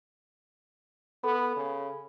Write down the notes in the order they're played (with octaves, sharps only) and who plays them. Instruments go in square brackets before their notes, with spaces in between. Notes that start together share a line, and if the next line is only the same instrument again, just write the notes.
[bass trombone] B3 [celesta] A4 B5
[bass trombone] C#3